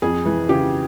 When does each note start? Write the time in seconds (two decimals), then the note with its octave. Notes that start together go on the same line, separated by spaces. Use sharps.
0.02 F2 G#4
0.26 E3
0.49 C#3 G4